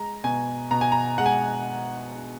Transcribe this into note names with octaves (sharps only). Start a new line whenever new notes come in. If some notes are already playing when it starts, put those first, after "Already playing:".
Already playing: G#3 A#5
B2 G#5
B2 A#5
G#5
A#5
G#3 F#5
G#5